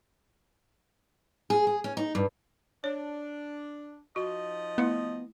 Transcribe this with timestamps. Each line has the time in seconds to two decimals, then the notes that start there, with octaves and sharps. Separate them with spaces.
1.50 G#4
1.67 G#4
1.84 C#4
1.97 D#4
2.15 G2
2.84 D4 C#5
4.16 F3 D#4 F#4 D#5
4.78 A3 B3 E4